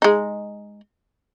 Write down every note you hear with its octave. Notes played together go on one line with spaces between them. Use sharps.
G#3 D#4